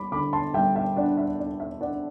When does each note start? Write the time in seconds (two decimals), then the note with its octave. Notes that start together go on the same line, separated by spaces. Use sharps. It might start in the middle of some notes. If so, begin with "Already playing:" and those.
Already playing: G3 B5 D6
0.12 D3 B5 D6
0.33 A5 C6
0.54 G3 E5 G5
0.75 E5 G5
0.96 D4 D5 F#5
1.18 E5
1.39 D4 D5
1.60 E5
1.81 D4 D5 F#5